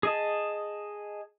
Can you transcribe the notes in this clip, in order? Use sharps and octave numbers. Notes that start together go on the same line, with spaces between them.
G#4 D#5 A5